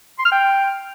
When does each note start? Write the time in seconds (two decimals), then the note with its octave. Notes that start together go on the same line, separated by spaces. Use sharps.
0.18 C6
0.25 F6
0.31 G5